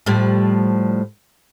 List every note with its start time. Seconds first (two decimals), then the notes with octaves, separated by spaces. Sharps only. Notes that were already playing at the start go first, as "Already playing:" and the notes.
0.06 A2 F3 G3